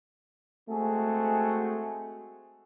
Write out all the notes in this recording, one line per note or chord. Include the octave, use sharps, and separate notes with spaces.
G#3 A3 C4 F#4 G#4